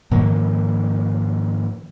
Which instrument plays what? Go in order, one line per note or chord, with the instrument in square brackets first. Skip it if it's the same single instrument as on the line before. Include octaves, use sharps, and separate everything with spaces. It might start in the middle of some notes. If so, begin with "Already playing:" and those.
[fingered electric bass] G#2 D#3 F3 A#3